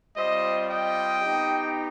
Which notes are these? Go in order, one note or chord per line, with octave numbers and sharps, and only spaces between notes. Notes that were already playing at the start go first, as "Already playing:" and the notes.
G3 C4 F4 C5 D#5
D#5 G5
B3 D#4 G4